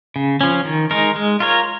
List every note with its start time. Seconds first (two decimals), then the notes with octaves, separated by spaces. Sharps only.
0.16 C#3
0.41 F3 C#4
0.65 D#3
0.91 G#3 D#4 A#4
1.16 G#3
1.40 F4 A#4 C#5